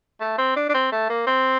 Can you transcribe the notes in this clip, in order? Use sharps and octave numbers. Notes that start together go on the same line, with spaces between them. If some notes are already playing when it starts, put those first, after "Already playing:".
A3
C4
D4
D4
C4
A3
A#3
C4